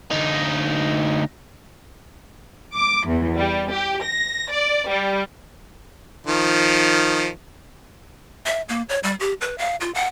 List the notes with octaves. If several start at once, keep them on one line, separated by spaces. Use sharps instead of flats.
D2 D#4
D6
E2
G3
G4
A#6
D5
G3
D#3 F3
E5
A#3
C#5
G3
G4
B4
F5
F4
F#5